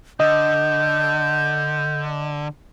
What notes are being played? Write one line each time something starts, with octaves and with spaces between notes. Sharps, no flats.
D3 D#5 G6